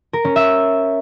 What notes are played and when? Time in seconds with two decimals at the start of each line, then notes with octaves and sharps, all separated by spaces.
0.13 A#4
0.25 C#4
0.36 E5